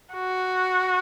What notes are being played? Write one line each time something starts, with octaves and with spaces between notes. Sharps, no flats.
F#4